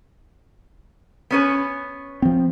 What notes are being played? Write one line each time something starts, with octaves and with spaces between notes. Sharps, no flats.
B3 C#4 B4
F3 C4